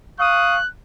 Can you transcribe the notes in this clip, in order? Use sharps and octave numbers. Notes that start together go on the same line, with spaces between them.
F5 C#6 D#6 F#6